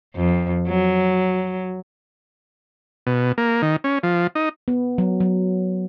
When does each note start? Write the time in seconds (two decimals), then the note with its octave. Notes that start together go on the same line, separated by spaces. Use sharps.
0.16 F2
0.68 F#3
3.07 B2
3.38 A#3
3.62 D#3
3.84 C#4
4.03 F3
4.35 D#4
4.68 B3
4.98 F#3
5.20 F#3